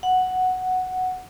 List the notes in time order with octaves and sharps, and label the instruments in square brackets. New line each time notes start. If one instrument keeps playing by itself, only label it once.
[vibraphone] F#5